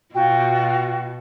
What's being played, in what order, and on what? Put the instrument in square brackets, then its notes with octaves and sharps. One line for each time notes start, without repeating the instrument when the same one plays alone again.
[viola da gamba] B2 [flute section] F4 F#4 [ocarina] G5